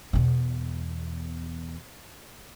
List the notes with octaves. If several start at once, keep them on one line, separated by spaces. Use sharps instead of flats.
E2 B2